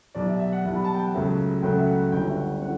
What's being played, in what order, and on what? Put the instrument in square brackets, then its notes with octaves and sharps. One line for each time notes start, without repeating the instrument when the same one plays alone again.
[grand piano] B1 B2 G3 D5
E5
E5
F#5
B1 B2 G3 E5
B5
A5
G5
F#5
C#2 C#3 F#3 A3 C#4 E5
C#2 C#3 F#3 A3 C#4 G5
F#5
E5
F#5
G1 G2 D3 G5
E5
F#5
D3 F#5